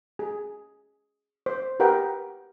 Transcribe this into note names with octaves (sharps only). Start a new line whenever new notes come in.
G#4
C5
G4 A#4 B4 F#5 G5